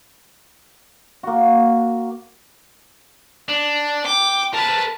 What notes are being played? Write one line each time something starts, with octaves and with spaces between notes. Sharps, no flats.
A#3 F#4
D4
G5 D6
A#4 B4 A5